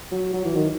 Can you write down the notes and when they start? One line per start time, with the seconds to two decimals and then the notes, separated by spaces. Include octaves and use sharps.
0.12 F#3
0.33 F#3
0.45 E3
0.56 D#3